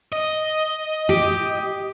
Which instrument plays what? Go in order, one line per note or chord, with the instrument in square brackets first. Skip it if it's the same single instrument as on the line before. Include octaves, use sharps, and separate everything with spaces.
[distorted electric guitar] D#5
[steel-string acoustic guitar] G4